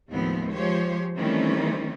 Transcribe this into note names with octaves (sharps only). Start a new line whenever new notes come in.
D#2 A2 F3 G#3 B3 C4
F3 G#3 G4 C5 C#5
D#3 E3 G3 A3 C4 C#4